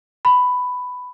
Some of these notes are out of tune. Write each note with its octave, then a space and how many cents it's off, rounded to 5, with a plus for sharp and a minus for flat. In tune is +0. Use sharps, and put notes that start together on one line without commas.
B5 +10